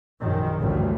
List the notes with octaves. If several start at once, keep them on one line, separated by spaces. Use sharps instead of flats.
A#1 F#2 D#3
A1 D2 G2